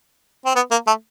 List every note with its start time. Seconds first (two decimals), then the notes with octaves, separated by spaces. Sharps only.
0.46 C4
0.55 B3
0.71 A#3
0.87 A3